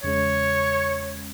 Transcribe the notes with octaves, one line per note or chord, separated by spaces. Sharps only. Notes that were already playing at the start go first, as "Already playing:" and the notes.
E2 C#3 G#3 C#4 C#5